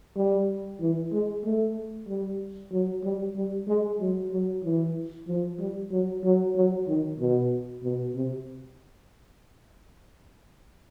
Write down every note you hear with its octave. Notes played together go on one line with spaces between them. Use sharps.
G3
E3
G#3
A3
G3
F#3
G3
G3
G#3
F#3
F#3
E3
F3
G3
F#3
F#3
F#3
D#3
B2
B2
C3